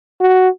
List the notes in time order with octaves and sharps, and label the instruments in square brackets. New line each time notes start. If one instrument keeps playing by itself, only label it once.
[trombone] F#4